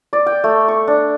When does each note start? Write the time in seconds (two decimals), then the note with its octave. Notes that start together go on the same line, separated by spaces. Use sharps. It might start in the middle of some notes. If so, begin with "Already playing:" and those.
0.13 D5
0.26 G5
0.44 A3
0.68 C#6
0.87 D4